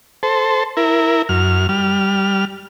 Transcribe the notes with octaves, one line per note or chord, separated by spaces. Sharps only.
A4 C5
E4 A#4
F#2 F6
G3 F6